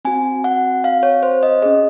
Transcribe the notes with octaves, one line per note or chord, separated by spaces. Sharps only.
C4 F#4 G#5
F#5
F5
C#5
C5
D#5
C#4 G#4 D#5